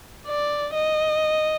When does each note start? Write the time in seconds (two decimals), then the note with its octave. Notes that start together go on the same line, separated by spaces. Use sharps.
0.28 D5
0.74 D#5